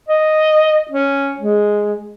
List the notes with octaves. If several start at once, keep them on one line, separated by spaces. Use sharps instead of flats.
D#5
C#4
G#3